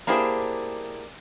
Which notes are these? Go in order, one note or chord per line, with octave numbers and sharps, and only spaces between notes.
A#3 D4 E4 G4 G#4 C5